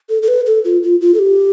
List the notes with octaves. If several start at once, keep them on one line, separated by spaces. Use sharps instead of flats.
A4
A4
B4
A4
F4
F4
F4
A4
G4